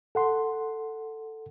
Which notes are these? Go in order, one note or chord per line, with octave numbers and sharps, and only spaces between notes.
A4 F#5 C6